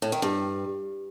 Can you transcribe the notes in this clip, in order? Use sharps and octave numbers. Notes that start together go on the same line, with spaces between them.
A2
D#3
G2